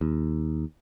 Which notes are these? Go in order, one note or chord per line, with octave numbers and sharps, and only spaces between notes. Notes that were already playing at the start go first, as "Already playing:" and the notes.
D#2